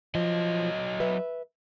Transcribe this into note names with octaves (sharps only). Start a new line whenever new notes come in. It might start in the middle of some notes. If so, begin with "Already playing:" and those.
F3 F#3 D#5
B4 E5